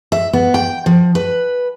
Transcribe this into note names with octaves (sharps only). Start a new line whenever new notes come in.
E5
B3
G5
F3
B4